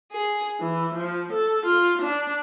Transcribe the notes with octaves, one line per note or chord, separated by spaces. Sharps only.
G#4
E3
F3
A4
F4
D4